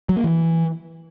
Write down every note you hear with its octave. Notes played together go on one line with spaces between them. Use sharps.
F#3
A#3
E3